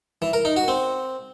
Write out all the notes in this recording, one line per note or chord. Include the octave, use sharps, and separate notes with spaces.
E3
A#4
D#4
F#4
C4